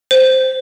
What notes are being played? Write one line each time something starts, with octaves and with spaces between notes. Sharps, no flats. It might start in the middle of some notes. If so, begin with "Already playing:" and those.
C5